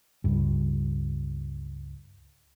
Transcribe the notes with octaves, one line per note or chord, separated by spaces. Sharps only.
C#2 G2